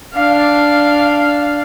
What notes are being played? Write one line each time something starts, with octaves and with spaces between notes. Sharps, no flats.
D4 F5